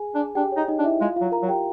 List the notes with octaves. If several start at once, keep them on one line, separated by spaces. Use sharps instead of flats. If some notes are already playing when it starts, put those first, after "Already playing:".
Already playing: G#4 G#5
D4
D4 G4 G5
D#4 C#5
D#4 D#5
D4
E4 E5
G#3 F4 F5
F#3 F4 F5
A#4 A#5
F#3
G4 G5